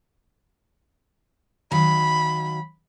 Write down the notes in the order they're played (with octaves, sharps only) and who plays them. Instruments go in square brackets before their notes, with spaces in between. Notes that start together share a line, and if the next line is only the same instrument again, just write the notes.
[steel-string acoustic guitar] D#3 F#3 F5 [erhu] B5